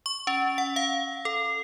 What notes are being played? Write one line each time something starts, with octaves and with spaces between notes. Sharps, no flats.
C#6
C#4
F#5
F5
A4